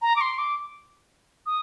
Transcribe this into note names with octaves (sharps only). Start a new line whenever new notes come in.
A#5
D6
C6
D6
D#6